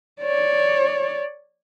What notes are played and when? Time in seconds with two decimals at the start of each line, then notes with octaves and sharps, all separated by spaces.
0.22 C#5 D5